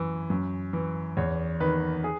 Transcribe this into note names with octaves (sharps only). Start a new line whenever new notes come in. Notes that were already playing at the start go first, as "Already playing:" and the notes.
Already playing: F#2 E3
F#2
E3
E2 C#5
D#3 B4
G#4